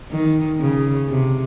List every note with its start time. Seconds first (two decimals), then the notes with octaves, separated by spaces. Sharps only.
0.11 D#3
0.60 C#3
1.09 C3